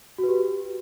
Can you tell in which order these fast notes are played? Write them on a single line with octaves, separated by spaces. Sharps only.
F#4 B4 G4